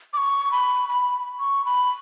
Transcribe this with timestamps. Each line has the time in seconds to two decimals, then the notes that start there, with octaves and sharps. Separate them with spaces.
0.13 D6
0.17 C#6
0.51 B5
0.89 B5
1.39 C#6
1.65 B5